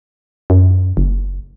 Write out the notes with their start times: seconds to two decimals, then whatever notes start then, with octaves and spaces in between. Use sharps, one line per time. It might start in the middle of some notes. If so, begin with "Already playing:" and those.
0.50 F#2
0.97 F#1